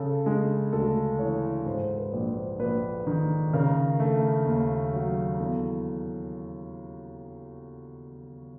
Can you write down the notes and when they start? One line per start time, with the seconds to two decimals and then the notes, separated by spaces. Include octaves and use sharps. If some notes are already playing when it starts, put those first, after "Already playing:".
Already playing: C#3 A4
0.26 G#3
0.73 D2 A4
1.19 E3 C#5
1.66 G#2 C5
1.98 B4
2.13 A#1
2.29 C5
2.60 A#1 B4
3.07 D#3
3.53 C#3 A#4
4.00 A3
4.46 D#2
4.93 F#3
5.40 E2 A4